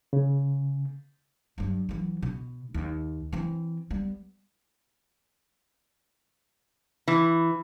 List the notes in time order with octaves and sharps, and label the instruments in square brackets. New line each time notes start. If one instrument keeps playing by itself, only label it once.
[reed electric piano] C#3
[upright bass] G2 F#3
E3 F#3
B2
D#2
E3 C4
G3 B3
[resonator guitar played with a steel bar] E3